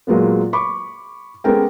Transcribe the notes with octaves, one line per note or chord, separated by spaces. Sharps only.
A#2 F#3 G#3 A#3 B3
B5 C#6 D6
G#3 B3 C#4 A4 A#4 G5